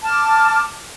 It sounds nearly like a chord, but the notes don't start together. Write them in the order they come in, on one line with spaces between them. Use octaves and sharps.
A5 F6 D6